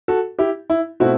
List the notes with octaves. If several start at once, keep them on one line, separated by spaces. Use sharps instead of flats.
F#4 A4
E4 G4
E4
B2 A3 C4 E4 F#4